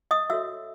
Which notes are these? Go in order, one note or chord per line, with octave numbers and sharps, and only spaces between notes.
D#5 D#6
F#4 A4 C#5 E5 E6